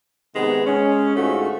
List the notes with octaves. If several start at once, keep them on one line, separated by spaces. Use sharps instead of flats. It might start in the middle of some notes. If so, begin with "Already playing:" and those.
C3 D#3 G#3 B3
G#3 C#4
G#2 D3 A3 F4 F#4